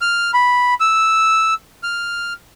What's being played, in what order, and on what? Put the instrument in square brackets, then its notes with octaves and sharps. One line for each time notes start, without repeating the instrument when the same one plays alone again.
[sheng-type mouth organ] F6
B5
E6
F6